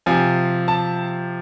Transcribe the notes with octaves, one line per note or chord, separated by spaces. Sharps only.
C3 F3 G#5
A5